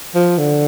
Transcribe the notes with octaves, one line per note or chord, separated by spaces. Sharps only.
F3
D3